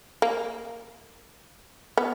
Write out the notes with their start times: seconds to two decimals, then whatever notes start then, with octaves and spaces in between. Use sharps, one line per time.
0.22 A#3
1.97 B3